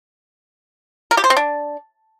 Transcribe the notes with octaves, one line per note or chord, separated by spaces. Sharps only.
A#4
G4
C5
C4
D4